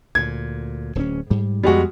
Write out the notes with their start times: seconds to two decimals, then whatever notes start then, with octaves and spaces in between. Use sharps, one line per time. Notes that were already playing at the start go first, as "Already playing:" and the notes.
0.15 D2 A#2 G#6
0.95 D1 C4 C#4
1.30 G#2 G3
1.63 F2 G3 G#3 B3 F#4